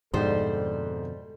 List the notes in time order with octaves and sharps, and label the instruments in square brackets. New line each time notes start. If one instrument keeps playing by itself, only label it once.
[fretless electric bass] F2 B2 D3 [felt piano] G#2 [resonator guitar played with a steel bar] G3 C5 [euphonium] A4